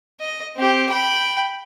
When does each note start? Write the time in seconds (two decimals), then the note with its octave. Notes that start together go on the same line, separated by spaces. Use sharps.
0.20 D#5
0.56 C4 G4
0.89 G5 B5